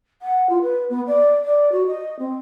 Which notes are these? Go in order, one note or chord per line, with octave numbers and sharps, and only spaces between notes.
F#5
F4
B4
B3
D5
D5
F#4
D#5
C4